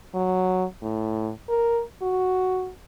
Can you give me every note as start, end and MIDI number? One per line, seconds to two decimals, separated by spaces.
0.14 0.64 54
0.82 1.31 45
1.49 1.81 70
2.02 2.70 66